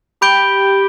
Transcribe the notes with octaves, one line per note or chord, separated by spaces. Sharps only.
G4 B5 G6 D7 G7